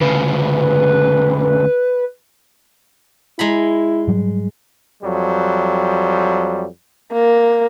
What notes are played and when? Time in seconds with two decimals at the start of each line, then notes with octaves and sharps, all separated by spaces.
0.01 D2 C#3 B4
3.39 G#3 E4 A#5 B5
4.07 G#2 F#3 G3
5.02 F2 F#3 G3
7.13 A#3 A#4